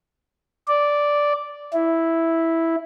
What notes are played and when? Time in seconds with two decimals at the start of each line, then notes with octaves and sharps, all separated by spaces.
0.68 D5
1.73 E4